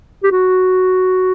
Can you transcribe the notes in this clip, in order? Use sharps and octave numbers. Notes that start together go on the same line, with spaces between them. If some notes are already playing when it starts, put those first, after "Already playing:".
G4
F#4